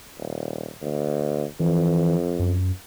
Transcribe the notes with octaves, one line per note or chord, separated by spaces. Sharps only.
D#1
D2
F2 E3
F#2